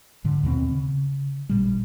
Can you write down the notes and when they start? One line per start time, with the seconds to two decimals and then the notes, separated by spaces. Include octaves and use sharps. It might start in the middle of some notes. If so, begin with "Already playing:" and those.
0.24 G#2 D3
0.43 D#2 B2 B3 C4
0.71 C#3
1.49 A1 A#2 G3